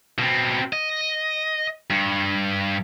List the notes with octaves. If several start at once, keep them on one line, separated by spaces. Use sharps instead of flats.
B2 C4
D#5
G2